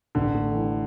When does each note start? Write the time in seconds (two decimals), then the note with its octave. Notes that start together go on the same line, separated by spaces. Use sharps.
0.15 A1 D3
0.35 A3
0.55 E3